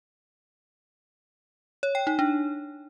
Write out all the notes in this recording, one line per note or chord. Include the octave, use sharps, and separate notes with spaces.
C#5
G5
D#4
D4